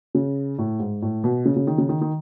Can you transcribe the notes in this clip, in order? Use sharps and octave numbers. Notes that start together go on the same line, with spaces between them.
C#3
A2
G#2
A2
B2
C#3
C#3
D#3
C#3
D#3
D#3